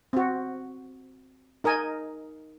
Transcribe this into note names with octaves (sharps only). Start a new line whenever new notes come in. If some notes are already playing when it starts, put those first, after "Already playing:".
C4 F#4
D#4 A#4 D#5 G#5